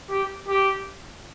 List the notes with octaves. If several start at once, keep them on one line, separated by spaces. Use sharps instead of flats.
G4
G4